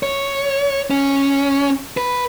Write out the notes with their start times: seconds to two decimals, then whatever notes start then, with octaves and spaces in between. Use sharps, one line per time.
0.03 C#5
0.90 C#4
1.97 B4